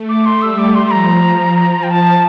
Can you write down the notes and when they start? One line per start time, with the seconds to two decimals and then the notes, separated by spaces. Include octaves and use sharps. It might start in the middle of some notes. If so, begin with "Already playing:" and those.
Already playing: A3
0.09 D6
0.26 C6
0.42 G3 E6
0.58 D6
0.75 C6
0.87 C6
0.91 F3 A#5
1.83 G5
1.90 A5